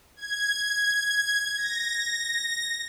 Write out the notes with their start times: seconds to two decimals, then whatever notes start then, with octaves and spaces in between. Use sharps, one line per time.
0.16 G#6
1.57 A#6